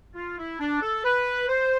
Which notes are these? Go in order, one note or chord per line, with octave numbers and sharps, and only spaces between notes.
F4
E4
D4
A4
B4
C5